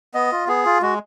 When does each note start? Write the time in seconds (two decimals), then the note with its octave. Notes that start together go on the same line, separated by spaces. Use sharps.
0.14 B3 D#5
0.32 F4
0.47 B3 G#4
0.65 F4
0.82 G#3 F#4